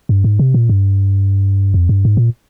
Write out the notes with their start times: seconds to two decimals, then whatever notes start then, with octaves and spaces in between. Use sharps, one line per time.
0.09 G2
0.24 G#2
0.39 C3
0.54 A#2
0.69 G2
1.74 F2
1.89 G2
2.05 G#2
2.17 A#2